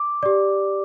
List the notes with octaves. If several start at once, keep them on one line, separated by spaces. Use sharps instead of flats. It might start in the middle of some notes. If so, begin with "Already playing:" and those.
Already playing: D6
G4 D5